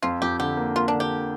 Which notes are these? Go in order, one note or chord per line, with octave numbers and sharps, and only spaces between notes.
F2 F4
F2 G4
D3 G4
A#3
A#3 F4
D4
D3
G4